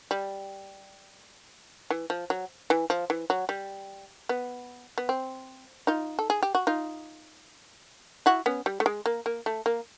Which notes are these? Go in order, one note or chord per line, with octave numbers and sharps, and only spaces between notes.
G3
E3
F3
F#3
E3
F3
E3
F#3
G3
B3
B3
C4
D#4 F4
A4
G#4
G4
F#4
D#4 F4
E4 F#4
B3 C#4
G3
A3
G#3
A#3
A#3
A3
A#3